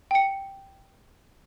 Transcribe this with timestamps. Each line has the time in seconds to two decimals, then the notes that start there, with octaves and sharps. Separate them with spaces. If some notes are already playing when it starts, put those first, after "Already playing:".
0.11 G5 C#7